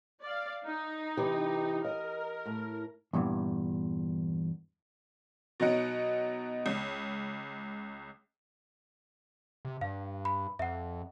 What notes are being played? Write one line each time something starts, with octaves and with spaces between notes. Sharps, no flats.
D5 F5
D#4
C3 E3 G4
A#4 D#5
A2
E2 G2 A#2 E3
B2 F#3 D#4 F#5 D7
C#2
C3
G2 F5
B5
F2 E5 F#5